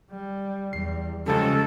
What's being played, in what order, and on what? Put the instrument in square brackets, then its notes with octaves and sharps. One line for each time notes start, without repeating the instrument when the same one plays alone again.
[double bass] G3
[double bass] E2 G3 [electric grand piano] C7
[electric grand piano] C#2 F3 G3 [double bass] C#3 G#3 [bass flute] C#4 [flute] A4